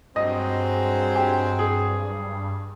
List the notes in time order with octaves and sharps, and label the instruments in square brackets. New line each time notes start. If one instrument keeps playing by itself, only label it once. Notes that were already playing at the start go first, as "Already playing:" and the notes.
[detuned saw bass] G2 [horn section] F#3 G#3 C4 [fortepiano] D#5
[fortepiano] G4
G#4